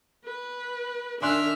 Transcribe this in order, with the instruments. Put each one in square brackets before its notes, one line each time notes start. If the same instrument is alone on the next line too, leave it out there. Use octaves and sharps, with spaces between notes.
[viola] B4
[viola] D#3 [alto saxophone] D4 [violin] E5 F6 [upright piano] G#5 C6 F#6